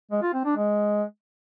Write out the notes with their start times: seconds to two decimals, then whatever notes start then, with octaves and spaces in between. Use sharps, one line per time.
0.11 G#3
0.23 F4
0.34 C4
0.45 D4
0.56 G#3